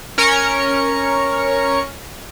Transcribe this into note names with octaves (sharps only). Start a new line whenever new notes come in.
C#4 A#4 C#5 C#7